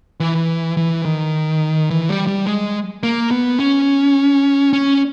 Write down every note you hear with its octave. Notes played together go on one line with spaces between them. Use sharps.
E3
E3
D#3
E3
G3
G3
G#3
A#3
B3
C#4
C#4